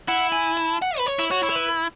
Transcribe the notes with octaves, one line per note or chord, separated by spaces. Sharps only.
E4 F#5
G#5
A5
F#5
B4
C#5
E4
F#4 C#5
E4
C#5
B4